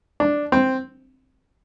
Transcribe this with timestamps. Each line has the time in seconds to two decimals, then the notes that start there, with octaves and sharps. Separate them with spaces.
0.20 D4
0.52 C4